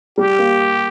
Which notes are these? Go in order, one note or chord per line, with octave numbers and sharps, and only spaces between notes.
G3 G4
A#3